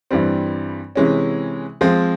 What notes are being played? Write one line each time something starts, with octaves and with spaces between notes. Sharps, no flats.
G2 E3 G3 C4
C3 E3 G#3 C#4
F3 G#3 C4